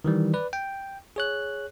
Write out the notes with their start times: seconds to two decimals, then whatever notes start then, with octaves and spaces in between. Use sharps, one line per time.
0.04 D#3 E3 G3
0.34 B4 D5
0.53 G5
1.16 G#4 C#5 F#6